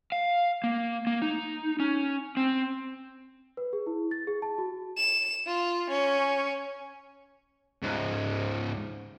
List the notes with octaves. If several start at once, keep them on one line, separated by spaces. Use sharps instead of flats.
F5
A#3
A#3
D#4
C#4
C4
B4
G#4
E4
A6
G#4
A5
F#4
E7
F4
C#4
C#2 G#2